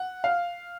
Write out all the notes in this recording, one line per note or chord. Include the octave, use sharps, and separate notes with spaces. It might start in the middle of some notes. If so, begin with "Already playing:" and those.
Already playing: F#5
F5